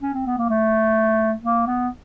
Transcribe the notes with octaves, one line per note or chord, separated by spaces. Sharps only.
C#4
C4
B3
A#3
A3
A#3
B3